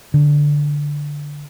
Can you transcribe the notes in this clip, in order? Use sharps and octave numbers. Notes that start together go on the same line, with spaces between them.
D3